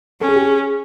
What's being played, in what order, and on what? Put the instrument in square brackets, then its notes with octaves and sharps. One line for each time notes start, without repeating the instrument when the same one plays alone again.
[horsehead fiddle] C#4 [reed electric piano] A4
[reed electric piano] G#4
G4
G#4